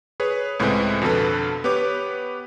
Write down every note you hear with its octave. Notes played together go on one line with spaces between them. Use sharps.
G#4 B4 C#5
C#2 A2 G#3 C4 B4 G#5
F2 B2 D3 A4 B4
B3 G4 B4 C#5 D6